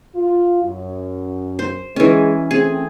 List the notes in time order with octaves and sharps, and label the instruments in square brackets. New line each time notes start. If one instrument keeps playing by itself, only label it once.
[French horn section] F4
F#2
[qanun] C5
[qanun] E3 C#4 [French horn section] G#3
[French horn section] A3 C4 [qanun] G#4